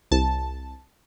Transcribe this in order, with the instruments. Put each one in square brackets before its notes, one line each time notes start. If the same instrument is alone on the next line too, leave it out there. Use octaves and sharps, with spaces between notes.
[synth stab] C2 A5